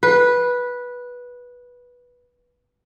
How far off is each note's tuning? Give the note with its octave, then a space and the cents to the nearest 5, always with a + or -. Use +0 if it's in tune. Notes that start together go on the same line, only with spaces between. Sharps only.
B4 -10